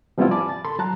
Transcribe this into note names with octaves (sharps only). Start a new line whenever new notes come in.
F3 G3 B3 C4 E4 F4
D5 G#5 A5 B5 D6
A6
A4 B5 C6
F#3 A5 A#5 F#6